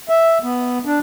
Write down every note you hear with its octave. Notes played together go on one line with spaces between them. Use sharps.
E5
B3
D4